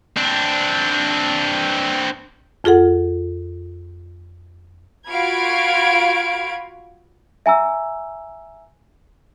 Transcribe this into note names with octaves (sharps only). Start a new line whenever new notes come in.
C4 D4
F2 F4 G#4 A4 F#5
F4 F#4 F5 B5 G#6 D7
E5 G#5 A#5 E6